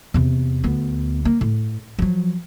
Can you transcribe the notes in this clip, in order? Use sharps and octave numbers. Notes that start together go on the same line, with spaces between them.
E2 C3
D2 B3
A#3
A2
F3 F#3